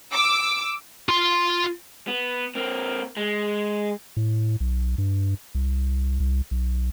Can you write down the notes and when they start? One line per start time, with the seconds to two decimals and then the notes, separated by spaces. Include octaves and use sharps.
0.12 D6 E6
1.09 F4 C6
2.08 B3
2.55 A#3 C4
3.17 G#3
4.17 A2
4.60 B1
4.98 G2
5.55 C2
6.20 C2
6.51 B1